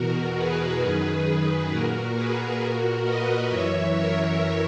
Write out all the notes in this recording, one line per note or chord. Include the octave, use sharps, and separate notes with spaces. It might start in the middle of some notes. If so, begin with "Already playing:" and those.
Already playing: E2 B2 F#4 A#4
G#4 B4
F#2 D#3 G#4 B4
A#2 F#4 A#4
G#4 B4
A#2 F#4 A#4
B4 D#5
F#2 E3 C#5 E5
A#4 C#5